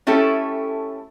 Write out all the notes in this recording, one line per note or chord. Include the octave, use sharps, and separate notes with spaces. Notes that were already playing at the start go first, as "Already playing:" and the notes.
A3 C#4 E4 G4 A4